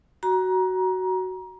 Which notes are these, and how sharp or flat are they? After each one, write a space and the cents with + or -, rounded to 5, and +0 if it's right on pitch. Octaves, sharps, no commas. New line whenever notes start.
F#4 +10 A#5 +25